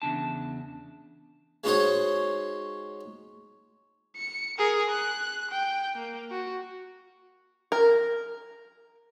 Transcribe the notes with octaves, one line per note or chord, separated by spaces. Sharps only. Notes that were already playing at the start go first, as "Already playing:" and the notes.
E2 C#3 D4 A5
G#3 C#4 D#4 F#4 C5 C#5
C#7
G#4 A#4
F#6
G5
A#3
F#4
A#4